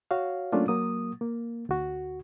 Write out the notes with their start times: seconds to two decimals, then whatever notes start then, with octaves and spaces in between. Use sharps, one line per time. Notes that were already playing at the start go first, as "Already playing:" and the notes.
0.11 F#4 C#5 F5
0.52 F#3 A3 A#3 C#4 D4 F4
0.68 F#3 A#3 D#6
1.21 A#3
1.69 D2 F#4